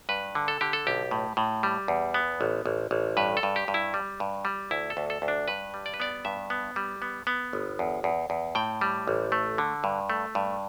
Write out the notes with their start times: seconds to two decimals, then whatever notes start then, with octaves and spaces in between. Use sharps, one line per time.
0.09 G2 B4
0.35 D3
0.48 A4
0.61 D3 G4
0.73 A4
0.87 B1 G4
1.11 A2
1.37 A2
1.63 G3
1.88 E2
2.14 B3
2.41 A1
2.66 A1
2.91 A1
3.17 G2 B4
3.37 A4
3.43 G2
3.56 G4
3.68 G2
3.74 E4
3.94 G3
4.20 G2
4.45 G3
4.71 D2 E4
4.90 A4
4.97 D2
5.10 A4
5.22 D2
5.28 D4
5.48 G2 B4
5.74 G3
5.86 D5
5.94 B4
6.00 B3 D5
6.25 G2 E5
6.50 B3
6.76 G3
7.02 B3
7.27 B3
7.53 G1
7.79 E2
8.04 E2
8.30 E2
8.55 A2 G5
8.81 G3
9.08 A1
9.32 A3
9.58 D3
9.84 G2
10.10 A3
10.35 G2